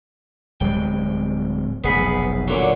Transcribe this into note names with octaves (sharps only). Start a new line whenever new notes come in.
D1 G3 G#3 G5
F1 B1 A3 B3 G#4 B5
A#2 D3 F#3